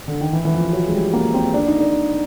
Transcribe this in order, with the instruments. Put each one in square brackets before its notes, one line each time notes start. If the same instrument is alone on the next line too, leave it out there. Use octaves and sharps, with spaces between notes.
[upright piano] D3
D#3
E3
E3
F3
F#3
G#3
G3
A#3
C4
D4
D#4
D4